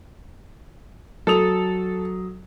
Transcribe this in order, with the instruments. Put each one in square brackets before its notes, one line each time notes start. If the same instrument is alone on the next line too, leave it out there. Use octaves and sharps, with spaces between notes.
[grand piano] F#3 D#6 F7 [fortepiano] A4